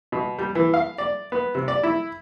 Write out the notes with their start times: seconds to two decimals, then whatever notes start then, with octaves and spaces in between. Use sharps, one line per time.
0.12 B2
0.38 G3
0.55 E3
0.74 F5
0.98 D5
1.32 B3
1.55 C3
1.68 D5
1.83 E4